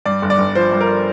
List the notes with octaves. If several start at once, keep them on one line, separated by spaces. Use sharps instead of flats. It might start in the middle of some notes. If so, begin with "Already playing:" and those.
G2 D5
G1
D5
G1
F3 C5
G2
A#4